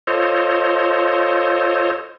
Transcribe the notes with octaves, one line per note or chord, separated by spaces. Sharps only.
F4 A4 C5 C#5 D#5